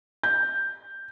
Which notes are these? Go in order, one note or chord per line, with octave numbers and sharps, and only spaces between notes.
G6